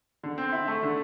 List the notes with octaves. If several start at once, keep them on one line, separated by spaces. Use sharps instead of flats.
D3
C4
E4
A3
D3